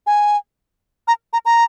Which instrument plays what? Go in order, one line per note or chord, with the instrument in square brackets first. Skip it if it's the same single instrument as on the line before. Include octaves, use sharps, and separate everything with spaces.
[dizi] G#5
A#5
A#5
A#5